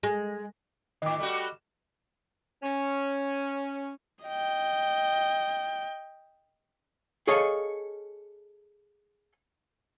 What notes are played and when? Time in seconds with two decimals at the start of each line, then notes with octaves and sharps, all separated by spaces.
0.03 G#3
1.02 A2 D#3 D#5 D6
1.18 G3 A3 F#4
2.63 C#4
4.25 D#5 G5
7.27 G#4 A4 C#5 D#5 F5